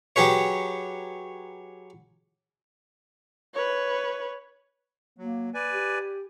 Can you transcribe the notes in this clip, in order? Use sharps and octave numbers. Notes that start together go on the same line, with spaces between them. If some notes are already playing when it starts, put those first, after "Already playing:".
F#3 G4 G#4 B4 C#5
B4 C#5
F#3 A#3
B4 D5 G#5
G4